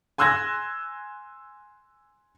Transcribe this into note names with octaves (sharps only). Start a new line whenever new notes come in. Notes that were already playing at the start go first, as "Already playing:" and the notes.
G#5 C6 E6 F#6 G#6 A#6